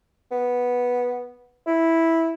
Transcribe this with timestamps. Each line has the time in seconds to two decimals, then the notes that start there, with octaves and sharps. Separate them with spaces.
0.31 B3
1.67 E4